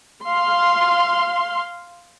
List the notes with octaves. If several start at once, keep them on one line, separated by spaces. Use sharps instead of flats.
F5 C6